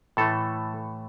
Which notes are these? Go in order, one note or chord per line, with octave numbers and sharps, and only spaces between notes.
A2 E3 A3 A4